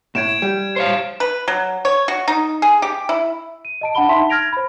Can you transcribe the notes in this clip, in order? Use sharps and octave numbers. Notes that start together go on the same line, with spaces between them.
A2 G#6 D7 E7
G3
C5 C#5 F5
B4
F#3
C#5
F#4
D#4
G#4
G4
E4
D#7
D#5 A5 D7
D4 F#5 A5 B5 G7
D#4 E5 A5 C6 B6
F6 G#6 A#6 D7 F7
C5 B5